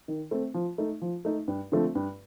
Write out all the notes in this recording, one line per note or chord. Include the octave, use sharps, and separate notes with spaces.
D#3
A3 C4
F3
A3 D#4
F3
A3 D#4
G2
D3 F3 A3 C4
G2